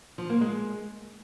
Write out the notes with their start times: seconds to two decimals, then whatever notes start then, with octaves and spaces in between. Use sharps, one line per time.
0.18 F3
0.30 A#3
0.41 G#3